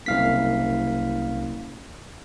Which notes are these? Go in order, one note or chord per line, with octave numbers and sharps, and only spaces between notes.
F#1 C2 F5 B6